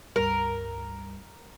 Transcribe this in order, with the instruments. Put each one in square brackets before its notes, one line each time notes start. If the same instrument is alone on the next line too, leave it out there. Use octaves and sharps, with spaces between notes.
[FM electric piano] C#2 G2 G3 [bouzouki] A#4